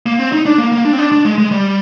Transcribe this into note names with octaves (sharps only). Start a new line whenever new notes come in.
A#3
C4
D#4
D4
A#3
A#3
D4
C4
D4
D4
G#3
G#3
G3